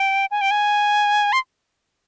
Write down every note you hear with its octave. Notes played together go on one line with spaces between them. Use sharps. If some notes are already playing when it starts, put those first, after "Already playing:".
Already playing: G5
G#5
G5
G#5
C6